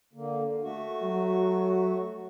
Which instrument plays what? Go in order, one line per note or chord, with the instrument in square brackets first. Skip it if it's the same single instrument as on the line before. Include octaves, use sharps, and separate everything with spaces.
[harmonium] D3 A#3
A3 F#4
[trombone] F#3